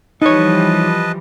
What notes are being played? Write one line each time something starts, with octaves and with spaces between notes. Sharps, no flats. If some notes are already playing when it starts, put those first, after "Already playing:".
E3 F3 G3 D#4 B4 C#5 D#5 A5